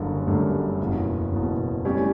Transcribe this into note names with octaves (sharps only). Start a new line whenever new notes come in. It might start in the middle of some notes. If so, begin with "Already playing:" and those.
Already playing: F#1 F#2 D3 G3
F#1 F#2 D3 G3
F#1 E2 B2
F#1 E2 B2
A2 G3 C#4 G4 D5